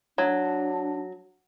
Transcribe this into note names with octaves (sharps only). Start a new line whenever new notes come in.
F#3 D4